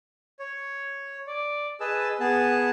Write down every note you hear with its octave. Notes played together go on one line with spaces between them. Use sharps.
C#5
D5
G#4 B4 D#5 A5 E6
B3 G#4 A5